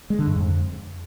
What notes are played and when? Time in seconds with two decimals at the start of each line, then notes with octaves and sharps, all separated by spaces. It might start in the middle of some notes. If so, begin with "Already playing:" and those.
0.10 G#3
0.19 D3
0.27 G2
0.36 F2